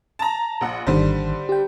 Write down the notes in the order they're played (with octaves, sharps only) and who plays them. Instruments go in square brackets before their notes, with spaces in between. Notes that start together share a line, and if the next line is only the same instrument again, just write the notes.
[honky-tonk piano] A5 A#5
A#1 F#5
[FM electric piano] G#1 D#3 [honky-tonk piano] D3 G3 C5
[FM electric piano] G4 G5